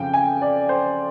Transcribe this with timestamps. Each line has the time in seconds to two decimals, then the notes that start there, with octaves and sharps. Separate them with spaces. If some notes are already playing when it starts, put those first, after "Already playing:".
Already playing: F2 C#3 F3 G5
0.14 G#5
0.42 D5
0.69 C5